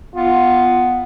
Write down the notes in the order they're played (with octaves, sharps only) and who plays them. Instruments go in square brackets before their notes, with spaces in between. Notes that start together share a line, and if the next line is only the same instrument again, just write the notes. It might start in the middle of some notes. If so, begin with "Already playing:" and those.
[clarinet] B3 [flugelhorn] F4